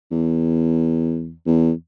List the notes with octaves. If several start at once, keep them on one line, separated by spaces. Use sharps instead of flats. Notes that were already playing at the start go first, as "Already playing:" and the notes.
E2
E2